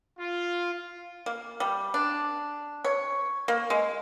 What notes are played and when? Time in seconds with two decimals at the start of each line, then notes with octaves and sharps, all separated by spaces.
0.19 F4
1.26 A#3
1.60 G3
1.94 D4
2.84 C#5
3.48 A#3
3.70 G#3